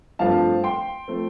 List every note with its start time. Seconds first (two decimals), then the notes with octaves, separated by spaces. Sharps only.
0.19 G2 F3 A3 C4 F5 A5
0.64 G5 C6
1.08 F3 A3 C4